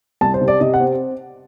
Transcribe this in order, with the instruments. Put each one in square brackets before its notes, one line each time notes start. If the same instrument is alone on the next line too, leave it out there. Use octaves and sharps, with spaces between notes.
[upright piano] C2 A5
C5
C3
D5
C3 D#5
F#5
C4